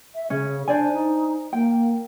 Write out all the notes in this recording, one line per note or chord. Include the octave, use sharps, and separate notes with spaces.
E5
C#3 C#4
D4 C5 D5 G#5
D#4
A#3 G5